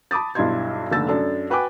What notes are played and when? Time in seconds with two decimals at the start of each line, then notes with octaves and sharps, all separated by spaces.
0.11 A5 B5 D6 D#6 A6
0.35 B1 G2 E4 D#5 C6 G#6
0.91 F1 D#2 D3 E6 A6
1.08 F#2 D4 A4
1.50 F#4 B4 G5 G#5 D6